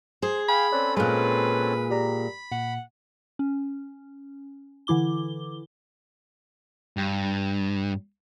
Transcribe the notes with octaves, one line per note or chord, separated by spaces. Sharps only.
G#4 C5
F5 G5 G#5 B5
C4 C#4 A4 C#5 D5 F#6
A#2 G#3 B4 G#5 F6 F#6
G4 D5 A#5 B5
A#2 F#5
C#4
D3 E3 E4 D6 G7
G2